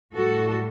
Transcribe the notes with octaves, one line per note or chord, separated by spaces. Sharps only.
A2 G3 F#4 A4